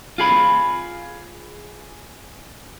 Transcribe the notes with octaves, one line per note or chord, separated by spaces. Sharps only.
F4 G#4 B5